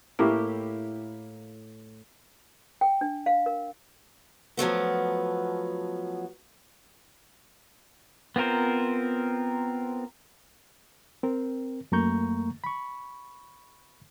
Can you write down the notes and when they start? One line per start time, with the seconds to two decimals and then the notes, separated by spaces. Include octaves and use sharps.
0.19 A2 A#3 E4 G4
2.81 G5
3.01 D4
3.26 F5
3.46 A#4
4.57 F3 F#3 A3 B3
8.36 B3 C4 F4 A#4 C5
11.23 C4 A#4
11.92 F#2 A3 A#3 A#5 C#6 G6
12.64 B5 C#6